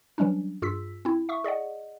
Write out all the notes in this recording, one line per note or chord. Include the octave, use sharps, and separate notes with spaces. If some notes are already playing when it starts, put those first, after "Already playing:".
E3 F#3 G3 C#4 D4
G2 F4 G#4 E6 B6
C4 E4
E5 C#6 D#6
G#4 D5 D#5 F#5